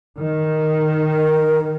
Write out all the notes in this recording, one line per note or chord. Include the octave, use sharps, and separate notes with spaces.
D#3
A#4